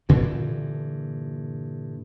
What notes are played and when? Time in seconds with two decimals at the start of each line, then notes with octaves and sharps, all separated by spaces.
0.09 G2 A#2 D3 E3